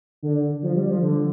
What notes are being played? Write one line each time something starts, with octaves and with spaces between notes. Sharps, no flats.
D3
F3
G3
F3
D3